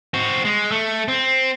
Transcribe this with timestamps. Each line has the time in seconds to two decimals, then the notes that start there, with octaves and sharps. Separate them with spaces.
0.14 C4 F#4
0.45 G#3
0.71 A3
1.08 C4